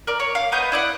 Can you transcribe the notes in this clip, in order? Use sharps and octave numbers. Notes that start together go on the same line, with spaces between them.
A#4 D5
C#5
F5
B3 B4 D#5 G6
E4 D5 F#5